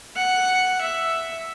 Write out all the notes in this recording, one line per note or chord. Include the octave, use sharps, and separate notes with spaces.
F#5
E5